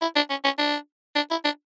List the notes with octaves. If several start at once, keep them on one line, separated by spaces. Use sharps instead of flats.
E4
D4
C#4
C#4
D4
D4
E4
D4